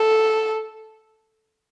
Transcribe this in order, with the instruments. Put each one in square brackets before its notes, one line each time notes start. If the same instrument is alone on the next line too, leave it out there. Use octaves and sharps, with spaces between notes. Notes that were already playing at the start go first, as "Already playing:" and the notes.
Already playing: [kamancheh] A4